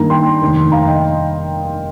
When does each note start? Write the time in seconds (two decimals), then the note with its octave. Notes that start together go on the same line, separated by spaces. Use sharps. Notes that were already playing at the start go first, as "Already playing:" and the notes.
Already playing: G2 D#3 A#3 D#4 A#5
0.10 G5 C6
0.42 F1 D#2 D#3
0.72 F5 A#5
0.87 D#5 G5